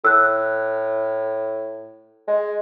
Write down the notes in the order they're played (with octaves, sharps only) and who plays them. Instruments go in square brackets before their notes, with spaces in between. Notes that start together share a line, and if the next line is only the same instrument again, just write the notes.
[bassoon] A2 [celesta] E6 F#6
[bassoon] G#3